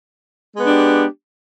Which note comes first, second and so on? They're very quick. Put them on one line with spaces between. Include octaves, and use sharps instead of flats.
G#3 B3 D4 G4